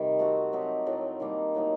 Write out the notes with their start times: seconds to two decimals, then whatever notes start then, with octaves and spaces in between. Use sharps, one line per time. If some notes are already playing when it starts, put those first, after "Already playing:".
Already playing: C3 D#3 G3
0.19 A3 C4 F#4
0.53 F#3 C4 D#4 G4
0.86 A2 F#3 A3
1.20 D#3 G3 A#3
1.54 A2 F#3 A#3 D#4